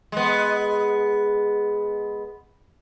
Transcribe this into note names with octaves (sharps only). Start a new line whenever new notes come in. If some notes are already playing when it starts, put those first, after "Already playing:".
G#3 B3